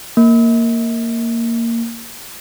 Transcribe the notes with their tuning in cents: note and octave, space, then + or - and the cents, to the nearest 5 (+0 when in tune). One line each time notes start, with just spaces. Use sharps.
A#3 -10